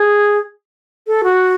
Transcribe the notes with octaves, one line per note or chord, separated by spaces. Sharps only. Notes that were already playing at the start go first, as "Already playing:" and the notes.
Already playing: G#4
A4
F#4